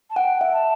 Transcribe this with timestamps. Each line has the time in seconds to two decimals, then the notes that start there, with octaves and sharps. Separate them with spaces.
0.10 A5
0.16 F#5 G5
0.41 E5
0.52 A5